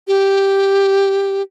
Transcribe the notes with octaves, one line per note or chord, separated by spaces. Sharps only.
G4